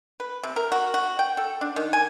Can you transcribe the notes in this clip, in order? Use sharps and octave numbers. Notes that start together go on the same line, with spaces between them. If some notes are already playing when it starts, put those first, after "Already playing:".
B4
C3
A#4
F#4
F#4
G5
A4
D4
D#3
G#5